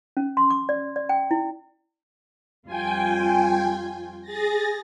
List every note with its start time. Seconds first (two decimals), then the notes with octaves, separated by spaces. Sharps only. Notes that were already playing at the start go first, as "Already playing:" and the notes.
0.17 C#4
0.37 C6
0.50 D6
0.69 D5
0.96 D5
1.09 G5
1.31 E4
2.67 F2 G3 F4 G5 G#5
4.22 G#4 A6 A#6